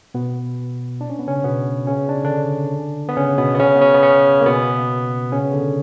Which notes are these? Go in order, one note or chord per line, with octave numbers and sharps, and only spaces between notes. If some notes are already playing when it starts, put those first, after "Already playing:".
B2 B3
D4
C#4
B3
C#3 C#4
B2 B3
C#3 C#4
D4
D3 D4
B3
C#3 C#4
B2 B3
B3
C#3 C#4
B3
C#3 C#4
B3
C#3 C#4
A#3
B2 B3
C#3 C#4
D3